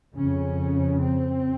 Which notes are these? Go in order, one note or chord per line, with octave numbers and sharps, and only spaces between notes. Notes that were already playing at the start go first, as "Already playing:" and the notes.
F2 C#3 C#4
C4